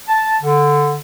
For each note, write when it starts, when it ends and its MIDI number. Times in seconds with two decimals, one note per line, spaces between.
0.09 0.35 81
0.42 0.96 50